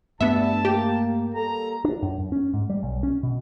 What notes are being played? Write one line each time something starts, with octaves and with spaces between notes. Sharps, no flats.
E2 G2 G3 A3 B3 D4 E5 A5
A#3 G4
G3 A#3 A4 A#5
D4
F#2
F#2
C#4
G#2
G3
B1
C#4
B2